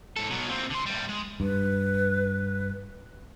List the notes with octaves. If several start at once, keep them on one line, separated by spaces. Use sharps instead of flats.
G#2 A4
B2 F#3
A#2 C4
D3 C6
A2 G3
G#3
G2 B4